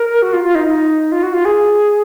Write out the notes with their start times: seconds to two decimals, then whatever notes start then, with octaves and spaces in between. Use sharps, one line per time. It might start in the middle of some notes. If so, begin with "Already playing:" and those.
Already playing: A#4
0.22 F#4
0.33 F4
0.44 F4
0.55 D#4
0.67 D#4
1.12 F4
1.23 F#4
1.34 F4
1.45 G#4